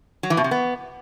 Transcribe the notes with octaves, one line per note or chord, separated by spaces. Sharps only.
F#3
E3
B2
C3
B3